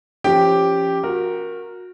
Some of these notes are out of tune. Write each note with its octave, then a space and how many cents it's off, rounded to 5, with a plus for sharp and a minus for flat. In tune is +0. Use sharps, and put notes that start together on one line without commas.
F3 -15 C#4 +0 G4 +0
F#4 -25 A#4 +0